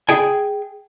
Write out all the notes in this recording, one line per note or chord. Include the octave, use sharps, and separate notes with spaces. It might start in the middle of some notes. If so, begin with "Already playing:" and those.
G#4 G5 G#5